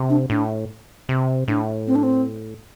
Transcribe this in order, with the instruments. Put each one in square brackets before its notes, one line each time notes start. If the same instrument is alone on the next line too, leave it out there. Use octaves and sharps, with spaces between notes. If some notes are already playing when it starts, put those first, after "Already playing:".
Already playing: [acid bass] C3
[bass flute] D4
[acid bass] A2 [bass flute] D4
[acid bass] C3
[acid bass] A2 [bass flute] D4
[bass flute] C4
D4
C4